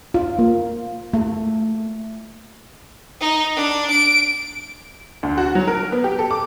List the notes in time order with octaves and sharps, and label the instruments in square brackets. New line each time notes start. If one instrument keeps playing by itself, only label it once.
[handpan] F4
A#3
A3
[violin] D#4
D4
D7
[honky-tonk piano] D2
F#4
F#3
A#4
B3
G4
A4
D6